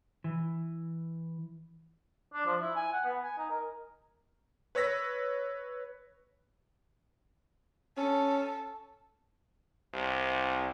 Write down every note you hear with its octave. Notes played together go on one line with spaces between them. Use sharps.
E3
D4
F3
E4
G#5
F#5
B3
G#5
D#4
A#4
B4 C#5 E6 A#6 B6
C#4 A4
C2